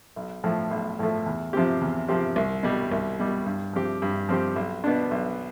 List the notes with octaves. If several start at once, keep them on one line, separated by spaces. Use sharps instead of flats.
B1
A2 F3 A3
B1
A2 F3 A3
E2
C3 F3 C4 G4
E2
C3 F3 C4 G4
C2
B2 G3
C2
B2 G3
G2
F3 C4 G4
G2
F3 C4 G4
B1
B2 B3 D4
B1